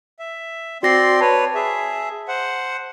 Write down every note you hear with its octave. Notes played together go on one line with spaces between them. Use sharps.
E5
C4 F#4 D5 C6 A#6 C7
B4 C#5 A5
G#4 E5
C5 F#5